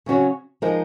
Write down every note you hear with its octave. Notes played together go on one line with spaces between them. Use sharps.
C#3 F#3 C#4 F#4 C#5
F3 G#3 D#4 A#4